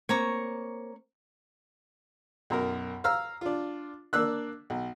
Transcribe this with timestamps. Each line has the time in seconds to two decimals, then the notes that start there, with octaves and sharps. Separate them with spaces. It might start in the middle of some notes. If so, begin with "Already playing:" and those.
0.09 A#3 C4 C#5 A#5 C#6
2.50 B1 F#2 A#4
3.04 F5 A#5 E6 F6
3.41 D4 F4
4.13 A#3 D4 E6 F#6
4.70 B1